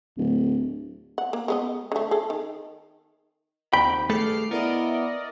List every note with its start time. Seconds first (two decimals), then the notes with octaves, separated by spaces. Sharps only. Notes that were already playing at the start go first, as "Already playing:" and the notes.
0.18 D1
1.18 F#5
1.33 A#3
1.48 G#3 B3 D#5
1.92 D3 A3
2.11 G#4 A4
2.30 D#3
3.73 D#2 C4 G5 B5
4.10 G2 A3 G#4 A4 D6 F6 C7
4.51 B3 E4 A#4 D5 D#5